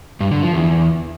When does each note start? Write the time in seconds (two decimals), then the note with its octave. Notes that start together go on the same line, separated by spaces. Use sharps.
0.20 G2
0.31 D3
0.42 F3
0.53 E2